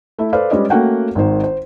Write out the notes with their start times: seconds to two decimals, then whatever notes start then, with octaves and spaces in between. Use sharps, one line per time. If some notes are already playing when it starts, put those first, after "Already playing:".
0.19 A3 E4
0.33 A4 B4 C5 D5 F5
0.51 G3 G#3 C#4 B4 D5 D#5
0.70 A3 A#3 C#4 F#4 F#5 G5
1.15 G#1 D#3 C5
1.44 C5